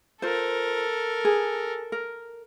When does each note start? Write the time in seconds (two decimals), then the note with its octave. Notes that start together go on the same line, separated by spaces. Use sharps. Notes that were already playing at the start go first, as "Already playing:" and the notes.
0.22 F4 A4 A#4 C5
1.25 G#4
1.92 A#4